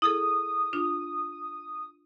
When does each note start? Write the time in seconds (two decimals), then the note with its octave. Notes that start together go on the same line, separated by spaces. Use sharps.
0.02 E4 G#4 A4 D#6
0.73 D4 F4